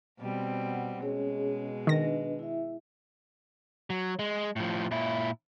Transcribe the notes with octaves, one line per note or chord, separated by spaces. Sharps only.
B2 G3 C4
F#5
B2 G#3 C#4 G#4 C#5
D#3 D4 B4 D#5 A#6
E4 E5
F#3
G#3
A2 F3
A#2 E4